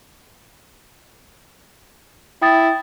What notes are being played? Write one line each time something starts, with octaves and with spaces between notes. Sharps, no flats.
E4 G5 D#6 A6